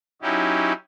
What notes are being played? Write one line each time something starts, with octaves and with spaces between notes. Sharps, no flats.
F#3 C#4 D#4 E4 G4